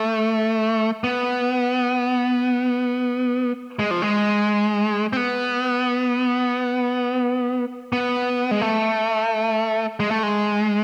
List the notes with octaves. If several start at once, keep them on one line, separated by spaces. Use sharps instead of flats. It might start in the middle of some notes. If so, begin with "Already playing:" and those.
Already playing: A3
B3
G#3
F3
G#3
C4
B3
B3
G#3
A3
G#3
A3
G#3